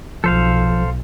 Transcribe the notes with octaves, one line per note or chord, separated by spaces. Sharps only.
B1 F3 A4 C5 F5